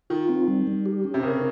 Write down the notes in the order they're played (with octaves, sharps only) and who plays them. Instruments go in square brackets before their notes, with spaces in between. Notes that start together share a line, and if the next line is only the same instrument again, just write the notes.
[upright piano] D#3 [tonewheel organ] F4
[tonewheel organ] C4
G3
G3
G4
C#4
[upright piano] C3
[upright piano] C#3 [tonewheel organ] A#4